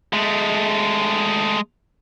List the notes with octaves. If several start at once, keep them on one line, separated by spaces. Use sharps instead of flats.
G#3 A3